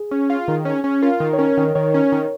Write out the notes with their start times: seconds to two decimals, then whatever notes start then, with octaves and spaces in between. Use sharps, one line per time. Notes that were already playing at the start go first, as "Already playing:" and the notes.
Already playing: G#4
0.11 C#4
0.30 F4
0.48 D#3
0.65 C#4
0.84 C#4
1.02 F4 A#4
1.20 D#3
1.33 C#5
1.39 C#4 A#4
1.57 D#3
1.75 D#3 C#5
1.94 C#4
2.12 D#3